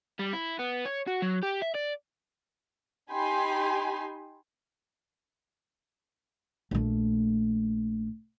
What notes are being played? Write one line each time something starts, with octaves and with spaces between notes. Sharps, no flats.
G3
E4
B3
C#5
F#4
F#3
G4
E5
D5
D#4 G4 G#5 B5 C6
A#1 A3